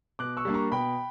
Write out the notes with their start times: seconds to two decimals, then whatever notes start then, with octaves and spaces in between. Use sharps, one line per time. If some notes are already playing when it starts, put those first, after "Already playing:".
0.19 B2 D6 F#6
0.37 C#6 E6
0.45 G3 A#3 D4
0.54 A#5 C#6
0.72 B2 G5 B5